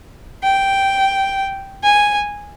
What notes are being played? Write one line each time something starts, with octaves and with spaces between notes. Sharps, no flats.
G5
G#5